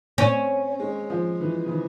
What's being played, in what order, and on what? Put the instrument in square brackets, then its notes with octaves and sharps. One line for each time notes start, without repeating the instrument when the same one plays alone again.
[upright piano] C4 [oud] C#4
[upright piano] G#3
F3
E3
C#3
E3